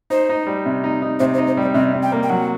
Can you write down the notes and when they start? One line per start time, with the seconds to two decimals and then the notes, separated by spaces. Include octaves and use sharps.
0.10 D#4 C5
0.29 D#4
0.47 G3
0.66 C3
0.84 D#4
1.02 D#4
1.20 C3 C5
1.34 C5
1.38 D#4
1.47 C5
1.57 G3 D5
1.74 C3 D#5
1.94 C3
2.03 G5
2.12 A#3
2.23 G5
2.29 F#3 F#5